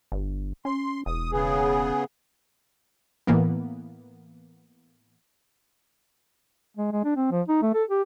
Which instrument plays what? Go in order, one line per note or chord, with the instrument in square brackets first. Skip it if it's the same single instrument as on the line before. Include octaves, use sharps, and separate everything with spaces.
[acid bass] G1
[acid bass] C#4 [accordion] C6
[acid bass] E1 [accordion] D#6
[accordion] C#3 B3 G#4
[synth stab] A2 E3 A#3 B3
[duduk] G#3
G#3
D4
C4
F3
D#4
A3
A4
G4